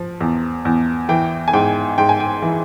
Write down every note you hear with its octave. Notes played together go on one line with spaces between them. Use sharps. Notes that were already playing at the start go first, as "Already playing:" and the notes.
Already playing: F3
E2
E2
E3 G5
G#5
G#2 G5
G#2 G5
G#5
G5
E3